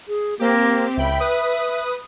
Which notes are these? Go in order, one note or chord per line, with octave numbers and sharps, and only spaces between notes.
G#4
A#3 C4 G4
C#2 E5 G5 B5
B4 D#6